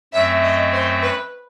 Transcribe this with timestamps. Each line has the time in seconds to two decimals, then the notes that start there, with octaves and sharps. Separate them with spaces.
0.13 F#2 F#3 A3 C4 E5
0.43 D#5
0.73 C5
1.02 B4